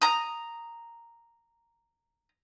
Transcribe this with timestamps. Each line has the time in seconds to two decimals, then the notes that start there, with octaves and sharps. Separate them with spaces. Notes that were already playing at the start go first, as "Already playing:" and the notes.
0.02 A#5 D#6